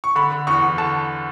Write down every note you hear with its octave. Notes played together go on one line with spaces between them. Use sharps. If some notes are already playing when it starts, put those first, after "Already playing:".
C#6
D3 B5
D3
E2 C#6
E2
D3 A5